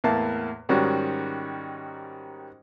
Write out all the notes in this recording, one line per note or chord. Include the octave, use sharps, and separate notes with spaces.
E2 A2 A#3 A5
G#2 D#3 G3 C#4 F#4